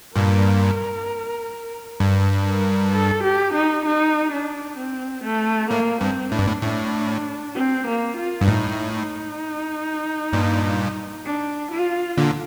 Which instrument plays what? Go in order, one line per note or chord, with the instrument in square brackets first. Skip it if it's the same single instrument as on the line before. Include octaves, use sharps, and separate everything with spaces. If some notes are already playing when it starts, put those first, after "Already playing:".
[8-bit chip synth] G2 A#2 [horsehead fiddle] A#4
[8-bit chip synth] G2
[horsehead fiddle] A#4
A4
G4
D#4
D#4
D4
C4
A3
[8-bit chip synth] A2 [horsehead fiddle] A#3
[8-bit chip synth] G2 [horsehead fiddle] C4
[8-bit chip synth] A2 [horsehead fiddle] D4
[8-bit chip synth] G2
A2
[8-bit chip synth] A2 [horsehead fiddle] D4
[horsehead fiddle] C4
A#3
F4
[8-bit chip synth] G2
[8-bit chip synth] A2 [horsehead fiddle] D#4
[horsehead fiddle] D#4
[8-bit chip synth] G2 A#2
[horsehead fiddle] D4
F4
[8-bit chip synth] A#2 D3